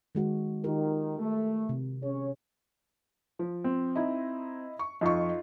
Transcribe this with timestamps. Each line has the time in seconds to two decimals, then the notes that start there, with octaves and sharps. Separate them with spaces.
0.15 D#3 G#3 F#4
0.64 D#3 F4 G4 A#4
1.19 A3
1.69 C3
2.03 C#4 G#4 C#5
3.39 F3
3.64 C4
3.96 D#4 E4 D#5
4.79 C#6
5.01 F2 D#4 F4 C#6